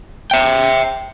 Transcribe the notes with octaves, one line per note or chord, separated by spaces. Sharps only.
E5 G5